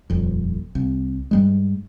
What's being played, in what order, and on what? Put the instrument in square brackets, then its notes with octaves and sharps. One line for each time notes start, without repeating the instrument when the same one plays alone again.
[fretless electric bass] D#1 F2
C2
G2 G3 G#3